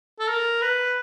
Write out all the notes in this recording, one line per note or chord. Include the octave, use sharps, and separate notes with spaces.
A4
A#4
B4